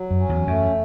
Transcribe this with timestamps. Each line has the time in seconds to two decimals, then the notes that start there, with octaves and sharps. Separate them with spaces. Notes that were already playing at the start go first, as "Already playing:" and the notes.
Already playing: F#3
0.11 F#2
0.20 C#4
0.29 E2
0.47 F#2 A3